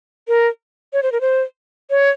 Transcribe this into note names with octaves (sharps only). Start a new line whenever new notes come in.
A#4
C#5
C5
A#4
C5
C#5